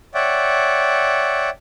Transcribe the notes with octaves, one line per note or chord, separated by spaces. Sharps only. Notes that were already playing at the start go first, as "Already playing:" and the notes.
C#5 D5 E5 F#5 G5